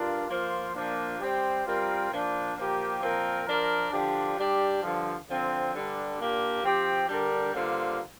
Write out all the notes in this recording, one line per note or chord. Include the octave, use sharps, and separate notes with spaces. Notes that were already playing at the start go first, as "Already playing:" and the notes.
Already playing: G2 D4 F4 A#4
F3 A#3 F4 C5
A#2 F3 A#3 D4
G3 C4 G4 C5
G3 C4 F4 A#4
A#2 F3 D4
A#2 F3 A#3 G4 A#4
A#2 F3 C4 A#4
F3 D4 A#4
D3 F3 D4 G4
G3 D4 G4
G2 D3 F3
D3 F3 C4
G2 D3 G3 D4
A#2 A#3 D4 G4
F3 C4 G4
D3 G3 D4 G4 A#4
G2 D3 A#3 F4 C5